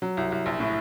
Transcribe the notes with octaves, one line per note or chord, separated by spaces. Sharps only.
F#3
C2
C2
A#1
A2